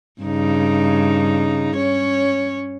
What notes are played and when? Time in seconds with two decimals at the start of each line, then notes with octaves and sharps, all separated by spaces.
0.22 G2 C#3 D#4
1.77 C#4 C#5